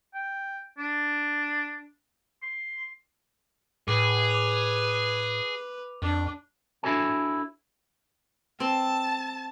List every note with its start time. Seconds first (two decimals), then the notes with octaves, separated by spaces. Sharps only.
0.14 G5
0.78 D4
2.43 C6
3.88 A2 G#4 B4 D6
4.30 D6 F7
6.02 F2 D4
6.83 D4 E4 F#4 A4 C#5 G#5
8.60 C4 A5